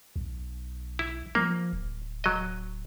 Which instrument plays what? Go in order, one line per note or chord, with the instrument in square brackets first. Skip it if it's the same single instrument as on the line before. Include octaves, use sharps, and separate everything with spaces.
[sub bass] B1
[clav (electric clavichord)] E4
[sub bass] F3 [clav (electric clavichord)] A#3
[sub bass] D1
[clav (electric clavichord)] F#3 D#5